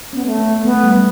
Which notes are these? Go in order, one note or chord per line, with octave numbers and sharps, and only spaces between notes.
B3 C#4
A3
B3
A3 B3
G3